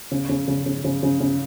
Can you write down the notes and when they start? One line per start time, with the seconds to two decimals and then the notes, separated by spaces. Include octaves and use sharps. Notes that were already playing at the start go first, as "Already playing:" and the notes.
0.11 C#3
0.29 C#3
0.48 C#3
0.66 C#3
0.84 C#3
1.03 C#3
1.20 C#3